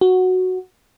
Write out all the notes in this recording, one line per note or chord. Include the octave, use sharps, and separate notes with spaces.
F#4